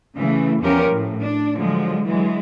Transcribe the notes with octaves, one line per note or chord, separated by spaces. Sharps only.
C#3 E3 A3
E2 F3 C#4 G4 A#4
A2
D4
D3 F3 F#3 G#3
E3 F#3 G#3